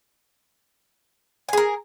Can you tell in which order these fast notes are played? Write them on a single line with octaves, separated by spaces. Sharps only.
G#5 G#4 A#4